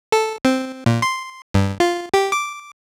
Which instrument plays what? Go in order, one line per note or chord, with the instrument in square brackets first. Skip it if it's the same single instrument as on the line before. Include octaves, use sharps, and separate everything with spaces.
[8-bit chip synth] A4
C4
A#2
C6
G2
F4
G4
D6